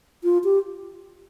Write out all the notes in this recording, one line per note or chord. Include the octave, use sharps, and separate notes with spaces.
F4
G4